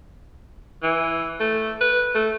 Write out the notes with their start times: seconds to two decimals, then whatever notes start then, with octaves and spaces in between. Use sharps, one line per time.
0.83 E3
1.40 A3
1.81 B4
2.15 A3